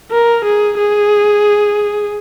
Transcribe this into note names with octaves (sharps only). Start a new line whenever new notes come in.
A#4
G#4
G#4